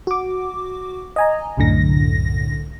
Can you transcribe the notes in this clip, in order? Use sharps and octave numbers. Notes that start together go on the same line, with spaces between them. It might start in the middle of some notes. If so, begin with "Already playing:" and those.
F#4 D6
D#5 G#5 A#5
C2 F#2 A2 D3 A#6